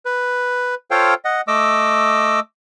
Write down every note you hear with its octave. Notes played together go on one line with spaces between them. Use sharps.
B4
F4 A4 C5 C#5 F5 G5
D#5 F#5
A3 D#5 D6 E6